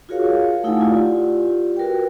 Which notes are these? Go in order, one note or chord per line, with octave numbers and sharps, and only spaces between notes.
F4 F#4 G#4 A#4 C#5 F5
A3 D#4 E4 F5 F#5 G#5
F4 G4 D5
F#4 A#4 B4 G5